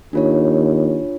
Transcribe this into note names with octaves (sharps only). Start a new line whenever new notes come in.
D#2 D4 F4 C#5